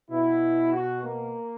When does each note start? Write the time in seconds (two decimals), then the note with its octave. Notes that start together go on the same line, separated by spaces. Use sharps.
0.10 B2 E4
0.73 F#4
1.04 A#3